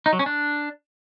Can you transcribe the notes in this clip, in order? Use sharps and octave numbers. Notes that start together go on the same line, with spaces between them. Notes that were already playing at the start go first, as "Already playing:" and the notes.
D#4
F#3
C#4
D4